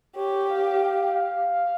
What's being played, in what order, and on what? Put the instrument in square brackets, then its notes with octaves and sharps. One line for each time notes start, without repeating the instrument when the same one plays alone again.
[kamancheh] G4 [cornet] C#5
[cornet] F5
F5
F5